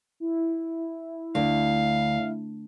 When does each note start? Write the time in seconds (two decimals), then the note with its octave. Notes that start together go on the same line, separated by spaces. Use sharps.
0.20 E4
1.35 D2 F5